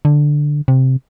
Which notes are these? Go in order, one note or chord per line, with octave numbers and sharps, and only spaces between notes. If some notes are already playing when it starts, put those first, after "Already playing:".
D3
C3